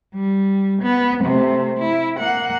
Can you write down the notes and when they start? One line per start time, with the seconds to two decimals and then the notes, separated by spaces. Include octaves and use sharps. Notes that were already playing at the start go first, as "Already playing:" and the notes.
0.14 G3
0.82 B3
1.24 C3 A3
1.78 E4
2.19 A#3 F#5